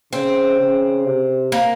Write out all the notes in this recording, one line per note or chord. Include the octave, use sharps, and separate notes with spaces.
C#3 C4
C#3
C3
A#3